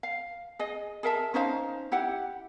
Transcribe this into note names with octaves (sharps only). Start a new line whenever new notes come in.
F5
G#4 D#5
G#4 A#4 E5 A5
C#4 D#4 C5 F5
E4 G4 F#5